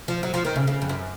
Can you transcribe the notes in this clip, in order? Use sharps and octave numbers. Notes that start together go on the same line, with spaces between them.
F3
F#3
F3
D#3
C#3
C#3
F2
F#2